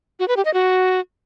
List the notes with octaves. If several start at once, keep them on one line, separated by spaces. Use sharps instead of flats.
F#4
B4
G4
D#5
F#4